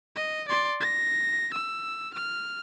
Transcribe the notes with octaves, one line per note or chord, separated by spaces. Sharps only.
D#5
D5 C6
A#6
E6
F6